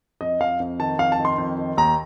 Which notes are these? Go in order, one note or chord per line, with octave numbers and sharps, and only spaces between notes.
F2 D#5
F2 F5
F2
D#3 A5
F2 F5
A5
D#3
C6
F2
D#3
D#2 A#5